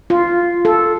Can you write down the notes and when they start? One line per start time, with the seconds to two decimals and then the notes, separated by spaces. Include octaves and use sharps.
0.10 F4
0.65 A4